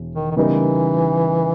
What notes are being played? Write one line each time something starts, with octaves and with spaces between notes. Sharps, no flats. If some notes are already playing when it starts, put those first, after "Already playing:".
Already playing: E1
D#3
D#3
C#3 E3 G3 B3 D#4 A#4